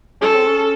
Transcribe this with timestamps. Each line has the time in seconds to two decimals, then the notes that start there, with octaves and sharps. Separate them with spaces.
0.21 C#4 A4
0.34 C4
0.47 C#4